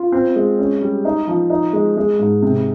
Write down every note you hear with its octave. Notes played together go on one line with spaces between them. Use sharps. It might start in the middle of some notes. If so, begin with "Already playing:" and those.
Already playing: F4
C4
G#3
C#4
G3
D#4
F3
D#4
G#3
G#3
G#2
C3